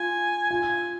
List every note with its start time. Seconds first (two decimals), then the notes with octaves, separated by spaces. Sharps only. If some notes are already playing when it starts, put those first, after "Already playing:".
Already playing: F4 G#5
0.50 F4 G#5